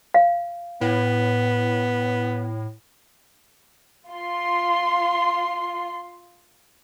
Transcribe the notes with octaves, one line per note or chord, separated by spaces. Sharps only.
F5
A2 B3
F4 C6